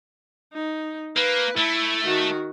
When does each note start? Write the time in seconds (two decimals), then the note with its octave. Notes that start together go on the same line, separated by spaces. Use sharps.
0.53 D#4
1.16 A#3 B4
1.58 A3 E4
2.04 D#3 F#4